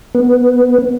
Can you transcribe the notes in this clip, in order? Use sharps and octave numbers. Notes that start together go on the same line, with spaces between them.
B3